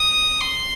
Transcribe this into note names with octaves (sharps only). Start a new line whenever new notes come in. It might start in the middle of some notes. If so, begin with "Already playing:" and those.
Already playing: D#6
C6